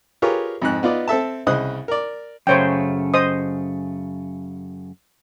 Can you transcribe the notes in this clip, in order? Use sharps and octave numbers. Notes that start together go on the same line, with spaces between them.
F4 G4 G#4 A#4 B4 C#5
F2 G#2 F#6
B3 D#4 F4 B4 D5 D#5
C4 A4 E5 A5
C2 C#3 C5 D#5 D#6 F#6
A#4 D5
F#2 C#3 A3 C5 C#5 G5
C5 D#5 D#6